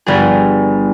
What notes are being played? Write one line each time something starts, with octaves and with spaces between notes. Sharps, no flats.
G1 G3 G#4